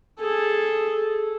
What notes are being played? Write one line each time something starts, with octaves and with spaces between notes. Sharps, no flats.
G#4 A4